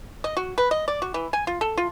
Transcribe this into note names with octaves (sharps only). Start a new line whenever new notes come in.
D#5
F#4
B4
D#5
D5
F#4
E3
G#5
F4
A4
F4